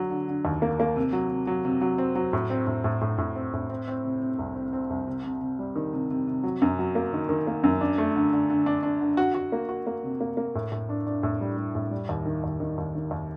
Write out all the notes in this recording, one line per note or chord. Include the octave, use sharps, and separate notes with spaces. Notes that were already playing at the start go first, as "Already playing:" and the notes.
Already playing: D3 F#3
D3
D3
D#2
A#3
A#3
C3
F#3
C3
F#3
C3
F#3
C4
F#3
A2
C4
A2
A2
A2
A2
C4
A2
C4
C4
C3
C3
C2
C4
C4
C2
C3
C3
C3
G3
D#3
C3
C3
C3
F#3
F#2
F#3
A#3
D#3
D#3
A#3
F#2
D4
A3
D3
D3
D3
D4
D4
D3
F#4
F#4
A#3
F#4
A#3
C3
A#3
A#3
A2
A2
D4
D4
A2
G3
G3
A2
G3
D#2
D#3
D#2
D#3
D#2
D#3
D#2